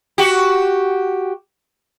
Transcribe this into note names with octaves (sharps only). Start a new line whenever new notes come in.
F#4 G4